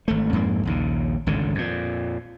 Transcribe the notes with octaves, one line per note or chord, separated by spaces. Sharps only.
G#1 A3
F2 G#2 A#3
A#1 D#2 C#3
G#1 C#2 A2 D3
F2 A#2